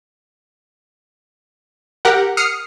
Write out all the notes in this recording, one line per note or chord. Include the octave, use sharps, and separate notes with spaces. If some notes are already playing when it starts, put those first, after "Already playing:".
G4 A#4 F#5
D#6 F6 C7 C#7